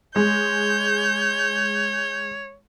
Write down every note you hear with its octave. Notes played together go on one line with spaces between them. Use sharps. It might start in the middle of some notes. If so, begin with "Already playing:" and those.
G#3 C#5 G6